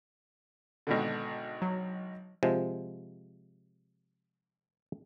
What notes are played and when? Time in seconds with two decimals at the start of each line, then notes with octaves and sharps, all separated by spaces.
0.87 G#1 B2 D3
1.62 F#3
2.43 C3 F3 G#3